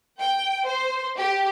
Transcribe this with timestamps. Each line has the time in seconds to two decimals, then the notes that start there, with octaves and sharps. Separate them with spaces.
0.19 G5
0.65 C5
1.16 G4